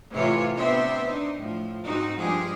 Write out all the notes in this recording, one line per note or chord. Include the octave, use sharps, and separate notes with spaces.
A2 C3 E3 F4 C#5
C3 B3 C4 D4 C5 E5
D4 D#4 C5
A2 F3
G#2 C4 D#4 F#4
G2 F3 G#3 G4 G#4